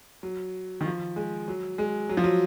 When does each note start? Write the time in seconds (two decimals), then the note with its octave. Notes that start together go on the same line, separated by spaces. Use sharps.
0.23 F#3
0.81 D#3
0.86 F3
1.16 G#3
1.48 F#3
1.78 G#3
2.09 F#3
2.17 F3
2.24 F#3